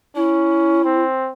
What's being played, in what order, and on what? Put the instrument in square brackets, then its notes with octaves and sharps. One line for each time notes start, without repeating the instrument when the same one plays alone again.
[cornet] C#4 [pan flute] E4
[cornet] C4